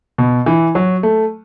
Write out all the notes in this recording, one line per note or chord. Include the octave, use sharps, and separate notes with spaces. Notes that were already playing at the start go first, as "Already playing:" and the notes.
B2
E3
F#3
A3